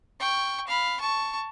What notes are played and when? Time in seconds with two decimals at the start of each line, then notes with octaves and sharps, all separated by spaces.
0.20 G5 C#6
0.68 F5 B5
0.99 A5 C#6